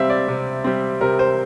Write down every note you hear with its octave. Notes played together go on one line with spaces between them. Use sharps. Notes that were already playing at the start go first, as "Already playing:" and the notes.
Already playing: C3 G3 C4 E5 F5
D5
C3
G3 C4
C3 A#4
C5